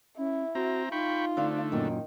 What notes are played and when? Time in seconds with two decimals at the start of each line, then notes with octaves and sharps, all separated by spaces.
0.18 C#4 E4
0.55 C4 F#4 A#5
0.92 D#4 F4 G5 B5 C#6
1.37 D3 A3 C4 D4 F5
1.72 F#2 A#2 D#3